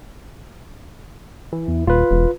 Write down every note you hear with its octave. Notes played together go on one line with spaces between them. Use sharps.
E3
E2
D#1 F4 B4
E1